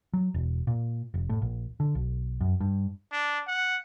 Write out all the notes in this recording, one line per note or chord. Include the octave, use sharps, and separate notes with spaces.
F#3
E1
A#2
F1
A2
A#1
D3
B1
F#2
G2
D4
F#5